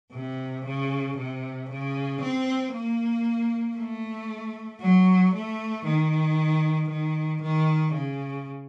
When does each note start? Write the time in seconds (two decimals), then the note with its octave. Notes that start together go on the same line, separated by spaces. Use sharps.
0.13 C3
0.65 C#3
1.17 C3
1.70 C#3
2.22 C4
2.73 A#3
3.77 A3
4.81 F#3
5.34 A3
5.86 D#3
6.90 D#3
7.42 D#3
7.93 C#3